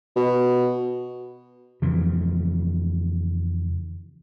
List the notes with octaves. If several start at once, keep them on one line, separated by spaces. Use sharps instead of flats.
B2
F2 C#3 E3